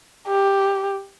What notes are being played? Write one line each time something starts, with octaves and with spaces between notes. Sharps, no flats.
G4